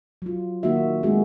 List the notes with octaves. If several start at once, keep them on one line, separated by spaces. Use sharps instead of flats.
F#3 F4
D#3 A#3 D#4 F#4 E5
G#3 A3 C4 D#4 F#4 G#4